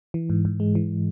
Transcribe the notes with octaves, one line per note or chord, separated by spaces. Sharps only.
E3
G#2
G#2
G#3
E3